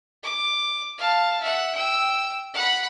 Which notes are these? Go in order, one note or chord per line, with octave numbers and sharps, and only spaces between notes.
D6
F5 A5
E5 F#5
G5 E6
F#5 B5